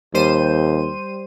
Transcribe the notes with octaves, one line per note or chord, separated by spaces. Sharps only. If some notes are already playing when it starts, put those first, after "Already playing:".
D#2 G3 C5 D#7